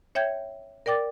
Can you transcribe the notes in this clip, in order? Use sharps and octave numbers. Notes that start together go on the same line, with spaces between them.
C#5 E5 G5 G6 G#6
A#4 D5 G5 D6 A6